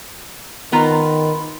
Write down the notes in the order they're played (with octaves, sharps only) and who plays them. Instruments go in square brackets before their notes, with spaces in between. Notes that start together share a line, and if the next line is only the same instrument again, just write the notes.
[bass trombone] D#3 [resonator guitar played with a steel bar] B3 F4 A#5